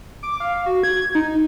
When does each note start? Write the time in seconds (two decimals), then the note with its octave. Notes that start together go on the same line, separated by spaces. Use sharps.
0.23 D6
0.40 F5
0.66 F#4
0.83 G#6
1.15 D#4